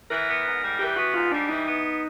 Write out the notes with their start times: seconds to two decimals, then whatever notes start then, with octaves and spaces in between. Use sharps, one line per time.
0.10 E3 A#4
0.27 B3
0.45 G#2
0.62 G3
0.79 E3 G4
0.96 B3 F#4
1.14 G#2 F4
1.31 G3 D4
1.49 E3 D#4
1.67 B3